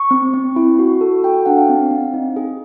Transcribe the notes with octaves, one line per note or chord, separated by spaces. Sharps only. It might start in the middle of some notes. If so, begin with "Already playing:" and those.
Already playing: C#6
C4
C4
E4
F#4
A4
F#4 G5
G5
D4 F#5
F5
C4
C4
D#4
G#4